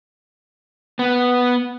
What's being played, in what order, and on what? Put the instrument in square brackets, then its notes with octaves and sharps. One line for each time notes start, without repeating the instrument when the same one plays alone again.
[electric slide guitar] B3